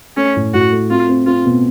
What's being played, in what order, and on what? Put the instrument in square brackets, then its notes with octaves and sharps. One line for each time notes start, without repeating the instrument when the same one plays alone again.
[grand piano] A3 [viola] C#4
[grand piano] A2
[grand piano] A2 [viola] F#4
[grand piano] A3
[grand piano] C4 [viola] F4
[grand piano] C4
[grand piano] C4 [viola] F4
[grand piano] B2